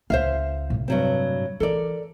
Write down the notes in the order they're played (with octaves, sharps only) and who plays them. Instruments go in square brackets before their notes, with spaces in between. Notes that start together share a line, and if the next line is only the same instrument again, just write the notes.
[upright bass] C#2 [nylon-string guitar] C5 E5 F5
[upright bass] A2 C3
[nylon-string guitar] G2 F#3 C4
[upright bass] E3 [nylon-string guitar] A4 A#4 D5